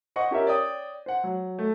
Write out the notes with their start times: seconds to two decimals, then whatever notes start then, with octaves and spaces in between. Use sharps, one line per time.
0.16 C5 D#5 F#5 C#6
0.31 C#4 G4 A#4 E5
0.46 C#5 D5 G5 D#6
1.06 C5 F#5
1.24 F#3
1.59 A3